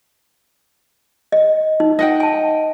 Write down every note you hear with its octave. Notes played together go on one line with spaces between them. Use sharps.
D#5
D#4
D#5 F#5 G5
G#5 A5